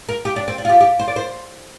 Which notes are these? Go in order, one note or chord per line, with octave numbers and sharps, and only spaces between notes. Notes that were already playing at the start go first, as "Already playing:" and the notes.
A#4
G4
D4
C4
D4
F4
G4
G4
C5
D5
C5